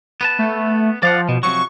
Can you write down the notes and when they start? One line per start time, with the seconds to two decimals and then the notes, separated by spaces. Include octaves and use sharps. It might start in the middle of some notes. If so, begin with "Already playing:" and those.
0.21 B3 B4 A5
0.39 A3
1.03 F3 D5 F5 F#5
1.29 B2 F3
1.43 C3 F3 F#3 C#6